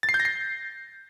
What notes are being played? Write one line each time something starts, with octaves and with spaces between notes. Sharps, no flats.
A6
C7
G6
A#6
C7